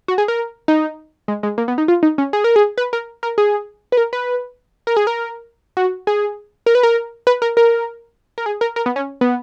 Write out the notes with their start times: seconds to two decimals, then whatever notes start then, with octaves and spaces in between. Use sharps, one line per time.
0.08 F#4
0.18 G#4
0.28 A#4
0.68 D#4
1.28 G#3
1.43 G#3
1.58 A#3
1.68 B3
1.78 D#4
1.88 F4
2.03 D#4
2.18 C#4
2.33 G#4
2.44 A#4
2.56 G#4
2.78 B4
2.93 A#4
3.23 A#4
3.38 G#4
3.92 B4
3.97 A#4
4.13 B4
4.87 A#4
4.97 G#4
5.07 A#4
5.77 F#4
6.07 G#4
6.66 A#4
6.75 B4
6.83 A#4
7.27 B4
7.42 A#4
7.57 A#4
8.38 A#4
8.46 G#4
8.61 A#4
8.76 A#4
8.86 B3
8.96 C#4
9.21 B3